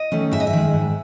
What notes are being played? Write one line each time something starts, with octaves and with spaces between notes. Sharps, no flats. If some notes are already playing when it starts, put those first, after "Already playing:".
Already playing: D#5
D#3 A3 C#4
G#2 E5
D#5
E5
D#3 G#3
G#2